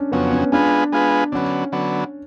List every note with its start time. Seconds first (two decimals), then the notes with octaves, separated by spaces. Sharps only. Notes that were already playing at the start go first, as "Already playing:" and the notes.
Already playing: C#4 D4
0.12 F2 C#3 F#3 B3
0.32 C#4
0.52 G#3 B3 D4 F4 G#4 B4
0.92 G#3 B3 F4 G#4 B4
1.32 D3 F#3 B3 C#4
1.72 D3 F#3 B3